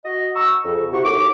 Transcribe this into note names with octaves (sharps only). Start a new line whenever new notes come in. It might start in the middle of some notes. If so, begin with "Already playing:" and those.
F#4 D#5
A#5 C#6 E6
F2 C#3
C3 E4 F#4 G4 F#5 C#6
D#2 A3 C#5 D6